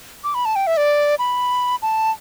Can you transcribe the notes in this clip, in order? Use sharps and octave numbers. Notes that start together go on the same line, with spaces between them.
D6
B5
A5
G5
E5
D5
B5
A5